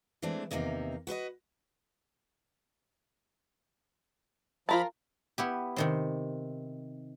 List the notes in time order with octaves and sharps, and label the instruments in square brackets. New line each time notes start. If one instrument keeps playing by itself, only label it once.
[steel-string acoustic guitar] E3 G#3 A3 C4 D4
E2 C3 D#3 A#3 D4 D#4
F#4 B4 C5 D#5
[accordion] F3 B5 [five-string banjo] F4 A#4 A5
[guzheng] B3 E4 G4
C3 D#3 C4